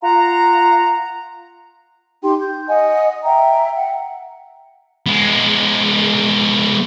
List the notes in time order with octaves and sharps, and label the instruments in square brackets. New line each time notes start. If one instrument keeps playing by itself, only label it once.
[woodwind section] F4 F5 F#5 A#5
[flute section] D#4 G4 G5 C6
G6
D#5 F#5 G#5
E5 G5 A#5
F#5
[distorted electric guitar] G#3 B3